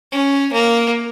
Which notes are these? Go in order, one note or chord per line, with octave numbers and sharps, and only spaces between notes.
C#4
A#3